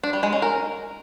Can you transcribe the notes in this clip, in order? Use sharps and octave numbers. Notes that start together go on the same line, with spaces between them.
D4
G3
G#3
C#4
A#4